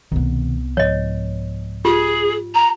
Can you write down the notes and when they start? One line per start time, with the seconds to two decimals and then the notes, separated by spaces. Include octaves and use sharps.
0.12 C2 B2 D#3 B3
0.77 G#2 F3 C#5 D#5
1.85 F4 G4 G#4
2.54 A#5